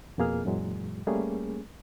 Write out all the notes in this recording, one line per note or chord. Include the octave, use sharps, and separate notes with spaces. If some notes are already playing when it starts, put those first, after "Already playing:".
F2 B2 A#3 G#4 F6
F#2 A#2 E3 F#3 G#3
G3 A3 A#3 C#4 G#4